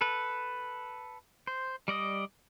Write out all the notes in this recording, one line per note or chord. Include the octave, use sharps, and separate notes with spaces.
A4 B4
C5
G3 D5 D#5 D#6